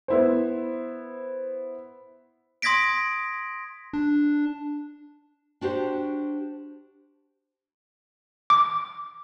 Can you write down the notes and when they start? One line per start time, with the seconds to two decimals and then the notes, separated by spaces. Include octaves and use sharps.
0.08 B3 E4 C5
2.62 C6 D#6 G#6 A#6 B6 D7
3.93 D4
5.61 D4 F#4 G4 C5
8.50 D6